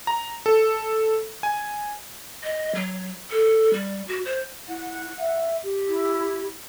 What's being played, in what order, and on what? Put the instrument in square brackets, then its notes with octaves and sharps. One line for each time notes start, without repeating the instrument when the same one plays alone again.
[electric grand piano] A#5
A4
G#5
[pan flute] D#5
F#3
A4
G3
F#4
C5
[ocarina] E4 [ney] F#5
[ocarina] E5
G4
[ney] E4